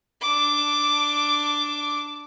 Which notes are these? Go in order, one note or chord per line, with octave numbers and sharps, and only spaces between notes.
D4 D6